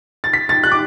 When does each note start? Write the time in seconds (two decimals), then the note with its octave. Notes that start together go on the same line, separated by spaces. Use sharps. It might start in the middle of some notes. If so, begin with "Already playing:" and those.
0.24 A6
0.33 B6
0.49 A6
0.64 F#6
0.71 D6